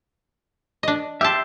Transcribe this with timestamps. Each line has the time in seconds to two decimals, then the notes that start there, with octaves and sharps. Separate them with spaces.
0.83 D4 D#5
1.21 G4 E5 A5 C6